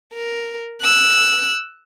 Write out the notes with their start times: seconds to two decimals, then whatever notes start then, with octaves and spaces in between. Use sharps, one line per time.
0.14 A#4
0.82 E6 F#6